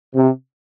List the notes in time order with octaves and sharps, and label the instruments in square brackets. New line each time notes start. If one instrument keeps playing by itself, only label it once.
[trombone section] C3